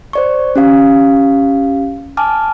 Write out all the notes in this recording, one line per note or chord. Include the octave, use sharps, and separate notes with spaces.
C5 D5 C#6
C#4 G4 F5
G#5 A5 D6 F6